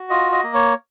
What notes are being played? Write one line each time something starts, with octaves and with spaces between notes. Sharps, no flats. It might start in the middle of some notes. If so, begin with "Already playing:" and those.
Already playing: F#4
F4 D#5
D#5
A#3
C#5